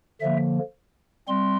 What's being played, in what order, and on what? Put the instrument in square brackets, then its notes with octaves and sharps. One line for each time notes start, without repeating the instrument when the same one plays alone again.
[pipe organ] D3 F3 A#3 E5
G3 C4 C6